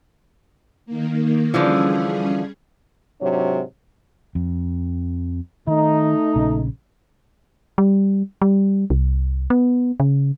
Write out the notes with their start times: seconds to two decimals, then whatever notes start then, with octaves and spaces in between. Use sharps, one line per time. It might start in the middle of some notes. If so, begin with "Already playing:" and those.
0.86 D#3 A#3
1.54 D3 E3 F3 G3 C#4 G#4
3.22 G#2 C3 F#3 D4 C#5
4.35 F2
5.67 D#3 A3 D#4
6.36 A#1 C#3
7.78 G3
8.42 G3
8.90 C2
9.50 B3
10.00 C#3